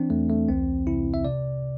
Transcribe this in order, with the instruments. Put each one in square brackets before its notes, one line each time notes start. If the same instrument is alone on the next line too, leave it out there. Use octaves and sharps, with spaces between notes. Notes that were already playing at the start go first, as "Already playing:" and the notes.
Already playing: [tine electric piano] E3 C4 D4
E2 A3
A3
C2 C4
C3 E4
E5
C3 D5